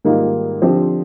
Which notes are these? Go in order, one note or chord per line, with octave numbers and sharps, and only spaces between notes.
G#2 D#3 G3 A#3 F4
D3 F3 C4 G4 C5